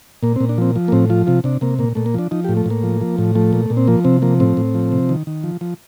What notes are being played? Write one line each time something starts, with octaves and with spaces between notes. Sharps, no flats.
A#2 A#3
C4
A#2
D4
F3 C4
F3
A#3
A2 C4
F3 F4
C3 F4
C3 D4
C3 A#3
A#2 A#3
A#2 A3
A#3
F3 D4
F3 D#4
G4
A2
A3
A2 A#3
F3
F3
A2
F3 A3
A#2
A#2
C4
F3 A#3
C3 C4
F3 A#3
A2 C4
A2
F3
C3
D#3
D#3
F3
F3